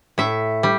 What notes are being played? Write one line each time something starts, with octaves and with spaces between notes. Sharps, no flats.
A2 E5
G3